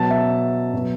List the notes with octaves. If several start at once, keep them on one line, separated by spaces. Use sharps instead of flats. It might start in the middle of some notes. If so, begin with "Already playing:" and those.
Already playing: B2 F#3 A5
E5
B2 F#3